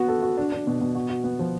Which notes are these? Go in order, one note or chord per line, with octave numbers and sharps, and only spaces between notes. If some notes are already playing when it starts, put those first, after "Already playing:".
Already playing: B3 F#4
A4
F#4
D4
D4
B2
B2
F#4
F#4
B3
F3